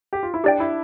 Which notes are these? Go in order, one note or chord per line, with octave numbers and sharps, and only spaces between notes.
G4
F4
E4
D4 G4 D5 G5
E4